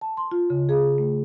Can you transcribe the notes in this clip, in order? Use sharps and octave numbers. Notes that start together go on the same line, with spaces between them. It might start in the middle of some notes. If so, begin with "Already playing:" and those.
A5
C6
F4
C#3
G#4
A3